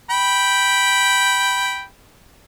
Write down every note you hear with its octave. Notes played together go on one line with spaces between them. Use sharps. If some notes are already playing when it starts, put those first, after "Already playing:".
G5 B5